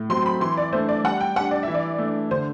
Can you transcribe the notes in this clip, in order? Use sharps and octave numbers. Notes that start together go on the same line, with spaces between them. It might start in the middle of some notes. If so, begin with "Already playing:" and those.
Already playing: A2
F#3 C4 C6
B5
E3 C6
D5
A3 D4 C5
D5
G3 F#5
G5
D4 G4 F#5
D5
E3 E5
D5
A3 D4
D3 C5